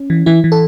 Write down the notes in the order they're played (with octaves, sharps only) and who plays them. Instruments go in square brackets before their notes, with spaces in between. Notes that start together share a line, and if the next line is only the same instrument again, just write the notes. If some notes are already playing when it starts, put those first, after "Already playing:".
Already playing: [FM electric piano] C#4
E3
E3 E4
E3
A4